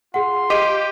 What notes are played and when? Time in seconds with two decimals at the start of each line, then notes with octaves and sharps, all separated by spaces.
0.14 F4 G#4 F#5 C6
0.50 G4 D#5 D#7